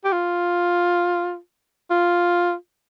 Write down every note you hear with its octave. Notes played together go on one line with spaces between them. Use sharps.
G4
F4
F4